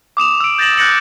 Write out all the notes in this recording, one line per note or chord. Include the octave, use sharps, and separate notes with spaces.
D6 D#6 E7 F7
E6 D7
G6 A6 A#6 E7 F#7
F#6 G6 A6 A#6 C#7 F#7